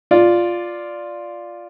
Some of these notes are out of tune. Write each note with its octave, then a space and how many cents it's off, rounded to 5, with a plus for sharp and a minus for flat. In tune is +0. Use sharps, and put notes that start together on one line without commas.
F4 +0 D5 +0